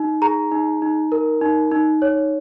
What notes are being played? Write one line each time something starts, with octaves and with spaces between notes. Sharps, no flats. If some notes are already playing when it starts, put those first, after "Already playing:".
Already playing: D#4
G#4 A#5
D#4
D#4
A#4
D#4
D#4
C#5